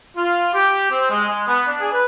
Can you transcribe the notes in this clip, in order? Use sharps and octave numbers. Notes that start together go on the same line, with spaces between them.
F4
G4
C4
G#3
G#3
B3
D4
G#4
B4